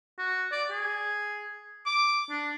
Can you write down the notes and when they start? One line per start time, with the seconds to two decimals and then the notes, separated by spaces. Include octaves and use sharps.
0.19 F#4
0.52 D5
0.70 G#4
1.86 D6
2.30 D4